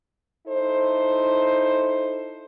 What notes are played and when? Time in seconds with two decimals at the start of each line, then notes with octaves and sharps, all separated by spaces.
0.47 D#4 E4 A4 C5